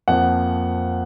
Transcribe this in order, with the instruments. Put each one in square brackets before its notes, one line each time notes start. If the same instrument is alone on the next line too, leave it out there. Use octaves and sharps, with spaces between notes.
[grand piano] F2 F3 A#3 [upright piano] F#5